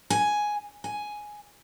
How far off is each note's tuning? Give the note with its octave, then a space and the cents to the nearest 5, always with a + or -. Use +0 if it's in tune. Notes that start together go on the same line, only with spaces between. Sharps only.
G#5 +5
G#5 +5